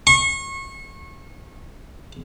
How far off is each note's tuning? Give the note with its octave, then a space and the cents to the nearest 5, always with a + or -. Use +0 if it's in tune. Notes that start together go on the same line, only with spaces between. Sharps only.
C#6 -30